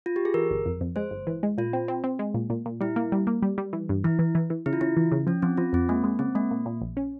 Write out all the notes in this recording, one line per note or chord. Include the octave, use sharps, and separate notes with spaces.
F4
G4
G#4
E3 A#4
G1
F2
F2
G#3 C5
G1
E3
G#3
A#2 F4
C4
C4
C4
G#3
A#2
A#2
A#2
G3 E4
A#3
G3
A#3
G3
G3
E3
G2
E3 E4
E3
E3
E3
C#3 E4
F4
C#3 E4
E3
C#3
F3 C#4
F3 C4
F3 F4
F2 C4
G#3 A#3
G#3
C#3 C4
G#3 A#3
A#2
A#2
A#1
C#4